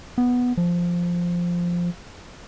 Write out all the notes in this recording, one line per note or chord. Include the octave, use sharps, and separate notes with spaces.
B3
F3